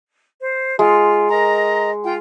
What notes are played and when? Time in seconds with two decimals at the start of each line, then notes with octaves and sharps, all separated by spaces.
0.42 C5
0.79 G#3 F4
1.30 A#4 D#5 A#5
2.05 F4 G5